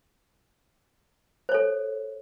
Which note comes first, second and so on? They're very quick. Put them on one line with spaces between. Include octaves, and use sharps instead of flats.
C5 C#5 A4